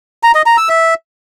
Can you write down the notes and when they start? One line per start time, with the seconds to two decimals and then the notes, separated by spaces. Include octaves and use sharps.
0.23 A#5
0.35 D#5
0.46 A#5
0.57 E6
0.69 E5